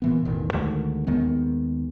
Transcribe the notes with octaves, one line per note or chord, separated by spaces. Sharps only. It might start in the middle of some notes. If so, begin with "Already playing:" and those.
A#2 E3 B3
E1 A1 D#3
D2 D#3 G#3
D#2 D#3 G#3 B3